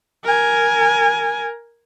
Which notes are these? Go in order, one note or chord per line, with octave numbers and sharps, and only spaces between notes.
A#4 G#5